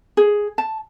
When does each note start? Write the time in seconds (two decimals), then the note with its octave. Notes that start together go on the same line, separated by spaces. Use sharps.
0.17 G#4
0.58 A5